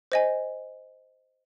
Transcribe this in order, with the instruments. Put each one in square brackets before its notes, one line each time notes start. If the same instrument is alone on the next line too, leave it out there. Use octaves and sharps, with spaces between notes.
[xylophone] C5 D#5 G#5